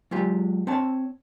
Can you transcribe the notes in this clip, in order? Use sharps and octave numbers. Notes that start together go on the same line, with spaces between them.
F#3 G#3 F4 G4
C4 C#5 A5